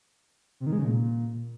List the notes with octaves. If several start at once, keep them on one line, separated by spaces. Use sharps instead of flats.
C3
D#3
G#3
C#3
A#2